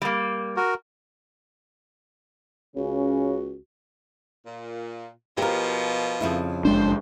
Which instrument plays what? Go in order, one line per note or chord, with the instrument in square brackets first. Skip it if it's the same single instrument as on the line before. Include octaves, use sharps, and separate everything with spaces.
[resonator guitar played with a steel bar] G3 A#3
[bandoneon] F#4 A#4
[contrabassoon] C#2 [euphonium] C#3 [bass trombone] C#4 [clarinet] F#4
[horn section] A#2
[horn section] B2 F3 [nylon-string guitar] G4 A#4
[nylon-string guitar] F2 C#3 E4
[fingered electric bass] F#1 G#3 D4 [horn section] A4 C5